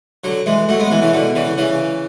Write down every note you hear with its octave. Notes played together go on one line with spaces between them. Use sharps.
D3 F#3
E3 G#3
F#3 A3
G#3 B3
E3 G#3
C#3 E3
B2 D3
C#3 E3
C#3 E3